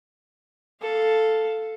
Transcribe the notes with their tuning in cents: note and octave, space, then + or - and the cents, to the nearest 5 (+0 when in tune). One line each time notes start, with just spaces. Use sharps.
A4 +0 F5 +0